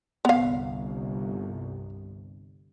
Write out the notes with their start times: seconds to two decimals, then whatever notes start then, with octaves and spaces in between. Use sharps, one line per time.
0.25 G1 C2 B3 F5